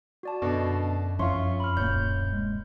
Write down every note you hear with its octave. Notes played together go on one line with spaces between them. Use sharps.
F#4 D5 A5
F#2 B2 D3 D5 D#5
F2 C#4 F4 E5 C6 C#6
B5 F6
D1 A#2 C#5 G6
G#3